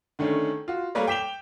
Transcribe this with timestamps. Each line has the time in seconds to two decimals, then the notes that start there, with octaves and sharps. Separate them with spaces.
0.19 D3 D#3 A3 C#4 D4
0.68 F4 F#4
0.95 G3 A3 A#3 B4 C#5 D5
1.07 G5 D6 B6 E7 F7 G7